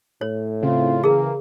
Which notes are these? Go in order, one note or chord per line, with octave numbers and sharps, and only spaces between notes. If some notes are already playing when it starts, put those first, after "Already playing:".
A2 C#5
C#3 C4 E4 F4
E3 A#3 G#4 A#4